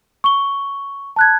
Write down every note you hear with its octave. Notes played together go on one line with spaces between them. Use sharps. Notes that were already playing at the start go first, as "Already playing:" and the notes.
C#6 G7
A5 F#6 G#6